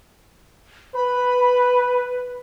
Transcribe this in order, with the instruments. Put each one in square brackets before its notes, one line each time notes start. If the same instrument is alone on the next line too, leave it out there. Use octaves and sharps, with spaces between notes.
[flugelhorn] B4 [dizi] B5